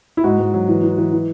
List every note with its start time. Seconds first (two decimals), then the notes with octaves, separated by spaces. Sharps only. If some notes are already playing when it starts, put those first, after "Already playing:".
0.17 E4
0.24 G#2 F#4
0.39 G#2
0.54 F#3
0.69 E3
0.83 E3
0.98 E3
1.12 E3